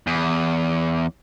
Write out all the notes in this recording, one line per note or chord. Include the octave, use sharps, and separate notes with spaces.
E2